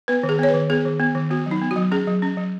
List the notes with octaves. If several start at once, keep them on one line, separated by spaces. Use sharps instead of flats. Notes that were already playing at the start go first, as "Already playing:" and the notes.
B3 B4
D#3
G#4
B3 C#5
B4
D#3
B3 G#4
D#3
B3
D#3
B3 F#4
F#3
D#4
B3
F#4
F#3
C#4 G#4
F#3
C#4
F#3